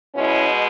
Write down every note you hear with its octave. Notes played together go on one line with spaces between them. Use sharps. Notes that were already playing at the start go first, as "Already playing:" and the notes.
B2 G#3 C#4 E4